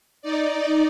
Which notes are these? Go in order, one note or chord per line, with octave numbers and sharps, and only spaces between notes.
D#4 D5